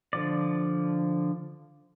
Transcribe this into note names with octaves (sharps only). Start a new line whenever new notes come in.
D3 F3 D5